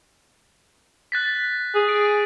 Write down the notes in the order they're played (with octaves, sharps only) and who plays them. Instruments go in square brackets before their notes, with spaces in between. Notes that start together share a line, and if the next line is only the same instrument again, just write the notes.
[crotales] F#6 A6 B6
[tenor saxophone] G#4
[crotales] D7